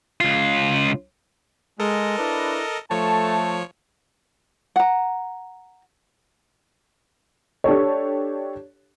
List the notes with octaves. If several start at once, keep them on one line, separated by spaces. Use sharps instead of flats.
C#2 F4
G#3 A4 A#4 D#5
D4 E4 B4
F3 A3 C#5 A5
F#5 A#5
D4 G4 A4 C#5